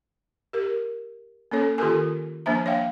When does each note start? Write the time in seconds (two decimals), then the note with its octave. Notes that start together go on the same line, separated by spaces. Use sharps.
0.53 G4 A#4
1.51 A#3 C#4 A4 C#5
1.78 D#3 F4 G4 A4 A#4 G#5
2.46 F3 A#3 D4 C5 E5 A#5
2.66 C#5 E5 F5 G5